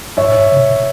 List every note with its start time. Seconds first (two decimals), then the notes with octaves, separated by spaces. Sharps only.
0.17 G2 C#5 E5
0.28 A2
0.38 G2
0.52 C#3
0.58 B2